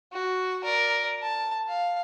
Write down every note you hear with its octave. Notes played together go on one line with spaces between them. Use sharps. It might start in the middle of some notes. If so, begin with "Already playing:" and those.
F#4
A#4 D5
A5
F5